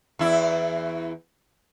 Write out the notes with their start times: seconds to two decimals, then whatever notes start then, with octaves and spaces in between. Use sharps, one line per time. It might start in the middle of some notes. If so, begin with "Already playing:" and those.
0.19 E2 E4